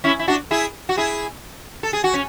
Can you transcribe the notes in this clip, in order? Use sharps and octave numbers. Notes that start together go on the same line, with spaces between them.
C#4 E4
E4
D4 F#4
E4 G#4
F#4
E4 G#4
A4
G#4
F#4
C#4